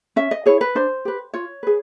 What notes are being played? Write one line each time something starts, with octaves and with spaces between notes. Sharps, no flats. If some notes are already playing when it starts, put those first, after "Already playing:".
C#4 E5
D#5
E4 G#4 C#5
B4
D4 C5
G4 B4
F4 C#5
G#4 B4